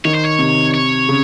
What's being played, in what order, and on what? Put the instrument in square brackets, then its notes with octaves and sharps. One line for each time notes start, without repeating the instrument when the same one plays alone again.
[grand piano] D#3 [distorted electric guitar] C#5
[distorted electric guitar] C5
C#5
[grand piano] C3
[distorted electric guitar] C#5
[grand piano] C#3